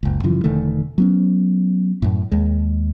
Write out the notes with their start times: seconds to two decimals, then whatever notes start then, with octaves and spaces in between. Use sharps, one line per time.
0.03 F#1 C#2
0.23 F#2 C#3 E3 F3
0.44 E1 D3 D#3 A3
0.98 F#3 B3 C#4
2.02 F#2 A2
2.32 D#2 G#3